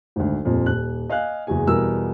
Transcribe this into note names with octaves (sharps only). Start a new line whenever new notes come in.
G#1 D2
D#1 F2 A#2
D#1 F#6
D#5 F5 G#5 F#6
F#1 E2 F#4 G#4 G#5
E2 B2 G3 A#4 E6